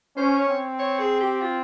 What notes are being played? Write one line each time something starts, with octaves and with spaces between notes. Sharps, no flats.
C#4 C5
C#5
C4
C#5
G#4
G4
F4